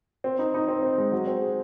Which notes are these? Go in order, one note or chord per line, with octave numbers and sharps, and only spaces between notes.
C4
D#4
D#4
C4
C4
G#3
F#3
C4
G#4